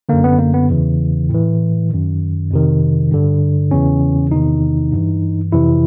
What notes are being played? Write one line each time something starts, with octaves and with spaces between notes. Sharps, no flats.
F#2 D3 A#3
B3
A#3
B3
E2 C#3 E3
A2 E3
F#2 D#3
F2 C3 D#3
G2 D3
E2 C#3 E3 C#4
E2 C3 D#3 D#4
G2 E3
F2 C3 E3 E4